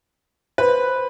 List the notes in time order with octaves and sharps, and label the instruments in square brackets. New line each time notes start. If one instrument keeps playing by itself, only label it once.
[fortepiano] B4 [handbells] C5 B5